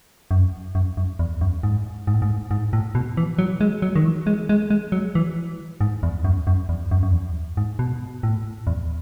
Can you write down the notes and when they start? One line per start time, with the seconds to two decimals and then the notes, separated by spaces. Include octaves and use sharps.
0.31 F#2
0.75 F#2
0.97 F#2
1.19 E2
1.41 F#2
1.63 G#2
2.07 G#2
2.14 A2
2.22 G#2
2.51 G#2
2.73 A2
2.95 B2
3.17 E3
3.39 F#3
3.61 G#3
3.82 F#3
3.96 D#3
4.05 E3
4.27 G#3
4.49 G#3
4.70 G#3
4.92 F#3
5.15 E3
5.81 G#2
6.03 E2
6.25 F#2
6.47 F#2
6.69 E2
6.91 F#2
7.03 F#2
7.13 E2
7.57 G#2
7.79 B2
8.23 A2
8.67 E2